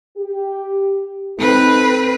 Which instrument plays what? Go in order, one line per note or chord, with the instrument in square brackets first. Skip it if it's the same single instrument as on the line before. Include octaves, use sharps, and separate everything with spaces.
[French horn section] G4
[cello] C4 B4 [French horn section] D#4 A4